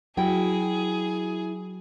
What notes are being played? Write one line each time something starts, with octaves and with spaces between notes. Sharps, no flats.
F#3 E4 F#4 G#4 G5